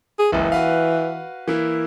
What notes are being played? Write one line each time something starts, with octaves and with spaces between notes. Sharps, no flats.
G#4
F#1 C#2 E3
F#4 B4 F5
E3 A#3 E4